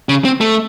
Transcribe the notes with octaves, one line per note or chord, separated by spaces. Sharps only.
C#3
C4
A3